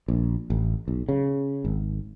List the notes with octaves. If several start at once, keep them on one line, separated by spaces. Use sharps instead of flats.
A#1
A1
B1
C#3
G#1